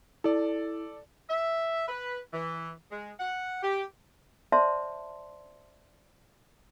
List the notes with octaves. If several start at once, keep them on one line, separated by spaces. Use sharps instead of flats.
E4 A4 D5
E5
B4
E3
G#3
F#5
G4
C5 D5 E5 A5 C6